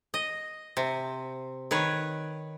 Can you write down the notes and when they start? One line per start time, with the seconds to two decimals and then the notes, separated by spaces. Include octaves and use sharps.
0.14 D#5
0.77 C3
1.71 D#3 B4 C#5